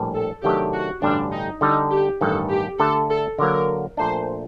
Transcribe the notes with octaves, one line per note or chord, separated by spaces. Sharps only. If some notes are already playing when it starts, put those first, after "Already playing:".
Already playing: A#1 A2 G3 D4
A4
C3 D#3 F#3 A3 D4 G4
F#4
A1 G2 D3 G3 D4
D#4
D3 G3 D4 D#4 A4
G4
A1 G2 D#3 A4
G4
D3 A3 D4 A4
A4
D3 F#3 A#3 A#4
A#1 A#2 A3 D4 C5